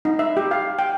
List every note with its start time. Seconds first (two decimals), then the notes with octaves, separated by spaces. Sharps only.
0.05 D#4
0.19 E5
0.37 G4
0.51 F5
0.79 G5